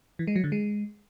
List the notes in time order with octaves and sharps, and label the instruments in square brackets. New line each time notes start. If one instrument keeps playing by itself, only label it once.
[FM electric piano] E3
G#3
F#3
D3
G#3